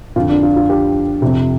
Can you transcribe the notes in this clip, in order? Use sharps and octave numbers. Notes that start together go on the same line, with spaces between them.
F2 D3 F4
D4
F4
F4
G4
F2 C3